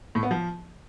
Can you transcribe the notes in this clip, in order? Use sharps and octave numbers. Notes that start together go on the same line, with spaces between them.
A2
B3
F3